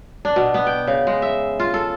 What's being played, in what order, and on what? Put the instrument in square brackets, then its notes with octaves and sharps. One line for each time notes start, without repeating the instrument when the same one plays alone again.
[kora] D4
B2
B3
G5
C#3
G#3
E5
F4
A4